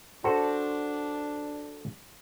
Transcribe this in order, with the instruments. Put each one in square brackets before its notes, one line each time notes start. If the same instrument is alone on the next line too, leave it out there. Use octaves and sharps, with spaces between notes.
[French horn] D4 [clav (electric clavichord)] F#4 A4 C5